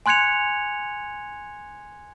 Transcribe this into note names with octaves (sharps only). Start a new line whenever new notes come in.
G#5 C6 F#6 G#6 C#7 F7